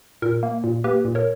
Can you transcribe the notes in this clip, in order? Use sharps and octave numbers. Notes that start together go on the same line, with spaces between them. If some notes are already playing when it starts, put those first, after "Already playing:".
A#2 A#4
A#3
A#2
A#3 G4 B4
A#2
A#4 C#5